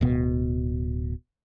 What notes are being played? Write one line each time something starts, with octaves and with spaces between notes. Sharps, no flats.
D1 B2